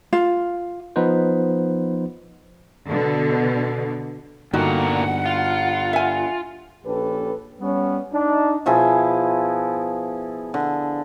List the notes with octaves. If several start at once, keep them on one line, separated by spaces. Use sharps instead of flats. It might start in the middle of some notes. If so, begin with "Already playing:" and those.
F4
F3 B3 D#4 B4 C5
B2 D3
G2 A#2 D3 G3 D#4 F#4 A#4 F#5
F4
E5 G#5
A#1 C#4 G4 A4 B4
G3 B3 C#4
D4 D#4
B2 F3 E4 G#4
D3